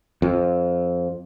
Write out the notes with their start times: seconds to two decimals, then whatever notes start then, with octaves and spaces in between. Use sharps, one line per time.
0.22 F2